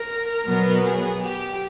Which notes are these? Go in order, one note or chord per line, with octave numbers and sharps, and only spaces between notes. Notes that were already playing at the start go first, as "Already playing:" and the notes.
Already playing: A#4
B2 F#3 B3
G#4
G4